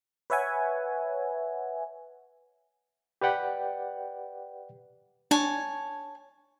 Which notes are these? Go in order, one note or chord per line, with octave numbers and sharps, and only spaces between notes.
B4 C#5 E5 F#5 G#5
G4 B4 D5 F#5 G5
D4 C#5 G#5 A5